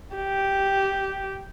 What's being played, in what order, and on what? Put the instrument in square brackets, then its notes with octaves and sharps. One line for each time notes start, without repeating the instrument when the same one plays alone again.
[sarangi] G4